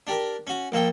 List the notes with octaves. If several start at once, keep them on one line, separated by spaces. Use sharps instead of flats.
D4 G4 A#4
C#4 F#4
A#1 A#3 A4 G5